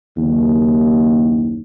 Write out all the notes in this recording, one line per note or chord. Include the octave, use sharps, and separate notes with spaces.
F#1 D#2